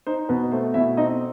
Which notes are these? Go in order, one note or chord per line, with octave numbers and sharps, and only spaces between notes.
D#4 C5
B2 B4
A3 C5
B2 E4 E5
C4 D#4 D#5